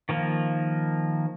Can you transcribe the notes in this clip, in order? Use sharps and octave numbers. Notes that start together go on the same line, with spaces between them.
D#3 F3 A#3